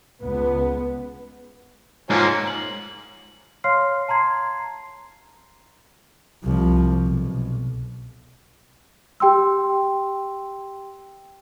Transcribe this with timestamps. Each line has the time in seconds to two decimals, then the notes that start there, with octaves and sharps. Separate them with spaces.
0.23 C#2 B3
2.10 G#2 F3 A#3 C#4
2.47 F#7
3.64 C#5 F5 C6 F6 C7
4.08 A5 A#5 C6 G#6 C7
6.44 C2 F3
7.05 B1
9.20 G4 G5 C6 E6